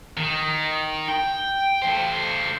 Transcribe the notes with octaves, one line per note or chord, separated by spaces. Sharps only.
D#3
G5
A3 C5